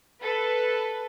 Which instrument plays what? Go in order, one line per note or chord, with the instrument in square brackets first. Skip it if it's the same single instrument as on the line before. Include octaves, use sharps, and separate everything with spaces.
[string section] A4 B4